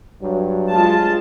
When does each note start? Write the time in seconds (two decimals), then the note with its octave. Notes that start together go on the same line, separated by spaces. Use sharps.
0.21 G2 F#3
0.72 G#3 F4 A5